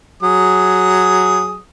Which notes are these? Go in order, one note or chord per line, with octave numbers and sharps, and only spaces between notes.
F#3 G#4 D#6